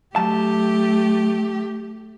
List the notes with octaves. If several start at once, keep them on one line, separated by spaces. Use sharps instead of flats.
F#3 A3 G4 A5